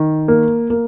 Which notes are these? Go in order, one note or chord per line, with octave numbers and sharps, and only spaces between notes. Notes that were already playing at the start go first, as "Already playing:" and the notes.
Already playing: D#3
A#3
A#3